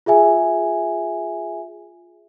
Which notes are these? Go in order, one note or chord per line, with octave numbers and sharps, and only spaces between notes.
F4 G#4 E5 G#5